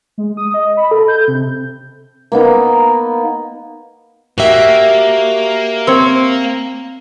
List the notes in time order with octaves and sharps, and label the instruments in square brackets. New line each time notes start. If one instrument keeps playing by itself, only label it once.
[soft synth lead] G#3
D#6
D#5
B5
A4
G6
C3
[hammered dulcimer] A#3 B3 D#4 A#5
[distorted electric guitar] A#3 [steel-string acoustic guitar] F#4 G4 E5
[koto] C4 C#5